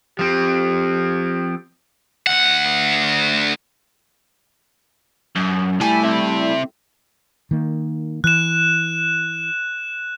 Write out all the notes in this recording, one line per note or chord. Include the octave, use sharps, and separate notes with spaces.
F3 C4 G4
D2 F#5
F#2
C2 G3 A3 E4 G#5
C4 E5
D#3 A#3
E3 F#6 E7